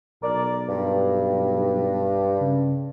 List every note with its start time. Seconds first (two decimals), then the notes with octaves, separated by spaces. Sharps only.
0.23 B1 A#4 D5
0.69 G2
2.40 C#3